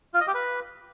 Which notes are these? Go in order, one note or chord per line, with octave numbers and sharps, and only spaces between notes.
F4
D#5
G4
B4